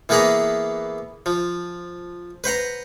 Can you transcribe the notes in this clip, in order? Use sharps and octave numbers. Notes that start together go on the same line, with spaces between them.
E3 A#3 B3 G#4 F#5 A#5
F3
B4 C5 F#5 A#5